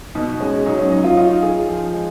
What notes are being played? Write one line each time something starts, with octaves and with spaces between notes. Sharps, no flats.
B2 D#4
G#3 C#4
F#3 D#4
C#4
F#3 D#4
C#4 F4
D#4 F4
G#4
F3
G#3